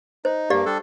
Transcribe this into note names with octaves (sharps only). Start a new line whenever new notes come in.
D#4 C5
G2 A#3 G4 D5 F5
G3 D4 A4